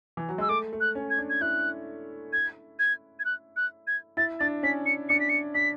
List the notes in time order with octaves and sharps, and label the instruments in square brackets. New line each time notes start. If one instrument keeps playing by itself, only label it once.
[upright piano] E3
F#3
[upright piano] G#3 [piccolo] E6
[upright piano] A3 [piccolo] D6
[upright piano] A3
[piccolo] F#6
[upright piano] C#4
[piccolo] G#6
[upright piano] D4
[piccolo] G#6
[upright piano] E4 [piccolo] F#6
[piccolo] G#6
G#6
G#6
F#6
F#6
G#6
[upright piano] E4 [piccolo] A6
[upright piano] D4 [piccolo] A6
[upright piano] C#4 [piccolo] B6
[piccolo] C#7
[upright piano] D4 [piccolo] C#7
[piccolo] B6
C#7
[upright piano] D4 [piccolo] B6